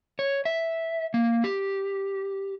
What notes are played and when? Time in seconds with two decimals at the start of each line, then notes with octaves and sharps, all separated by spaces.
0.19 C#5
0.45 E5
1.14 A#3
1.44 G4